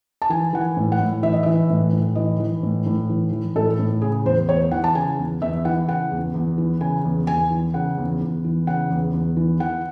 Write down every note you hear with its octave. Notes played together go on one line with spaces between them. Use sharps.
A5
E3 G#5
E3 F#5
G#5
A2
F#5
A2
E3 E5
D#5
E3 E5
A2
A2
E3 D#5
E3
A2
A2
E3
E3
A2 A4
A2
C#3 G#4
E2 C5
E2 C#5
E3 F#5
A5
C#3 G#5
E2
E2 E5
E3 F#5
C#3 F#5
E2
E2
E3
C#3 G#5
E2
E2 G#5
E3
C#3 F#5
E2
E2
E3
C#3 F#5
E2
E2
E3
E3 F#5